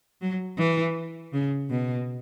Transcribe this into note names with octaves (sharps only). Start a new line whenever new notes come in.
F#3
E3
C#3
B2